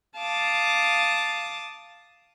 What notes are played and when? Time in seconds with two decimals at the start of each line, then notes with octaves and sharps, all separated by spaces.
0.18 F5 A5 D6 D#6